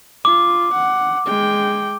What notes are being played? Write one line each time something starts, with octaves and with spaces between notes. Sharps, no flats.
F4 D6
F#5
G#3 G5